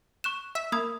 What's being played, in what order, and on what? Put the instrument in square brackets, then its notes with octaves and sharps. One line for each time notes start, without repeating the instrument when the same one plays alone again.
[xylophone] C#6 F#6 E7
[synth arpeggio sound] E5
[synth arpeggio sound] A#3 [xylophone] B5 D#6 G#6